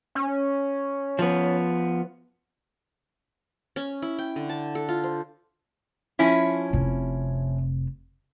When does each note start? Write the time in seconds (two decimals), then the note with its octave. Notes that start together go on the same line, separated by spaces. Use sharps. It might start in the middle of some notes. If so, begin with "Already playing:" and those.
0.15 C#4
1.19 F3 B3
3.76 C#4
4.02 E4
4.19 G5
4.36 D3
4.49 A5
4.75 A4
4.89 F4
5.04 C5
6.19 F3 C#4 E4
6.73 F1 C3